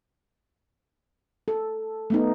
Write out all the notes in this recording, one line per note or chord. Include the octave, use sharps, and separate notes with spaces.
A4
A3 B3 D#4